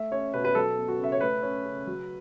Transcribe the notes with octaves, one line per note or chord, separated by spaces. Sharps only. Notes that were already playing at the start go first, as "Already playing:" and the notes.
Already playing: A3 E5
C#4 C#5
B2 B4
B4
F#3 A4
B3
F#4
C#3 E5
C#5
A3 B4
C#4
C#3
F#3